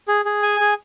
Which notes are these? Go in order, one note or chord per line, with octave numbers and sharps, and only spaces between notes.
G#4
G#4
G#5
G#4